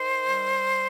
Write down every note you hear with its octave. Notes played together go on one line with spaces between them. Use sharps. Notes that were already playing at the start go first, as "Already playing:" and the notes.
Already playing: D#3 C5
G3